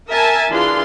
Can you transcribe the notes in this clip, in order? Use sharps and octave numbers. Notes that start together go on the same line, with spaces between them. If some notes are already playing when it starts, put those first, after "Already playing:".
A#4 E5 G#5 A5
E3 D4 F4 G#4 C6